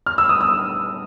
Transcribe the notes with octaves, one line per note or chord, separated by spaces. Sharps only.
F6
E6
D#6
E6